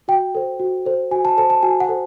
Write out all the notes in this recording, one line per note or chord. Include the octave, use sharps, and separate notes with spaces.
F#4 G5
A4 C5
F#4
A4 C5
F#4 G#5
A5
A4 C5 A5
A5
F#4 G#5
F#5
A4 C5